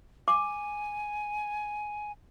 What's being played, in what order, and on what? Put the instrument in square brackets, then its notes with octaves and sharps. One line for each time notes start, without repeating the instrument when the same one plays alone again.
[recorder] G#5 [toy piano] D6